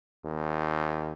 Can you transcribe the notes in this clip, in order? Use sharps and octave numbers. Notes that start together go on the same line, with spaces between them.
D#2